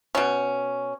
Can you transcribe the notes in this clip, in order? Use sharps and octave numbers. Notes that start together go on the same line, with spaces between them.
B2 C#4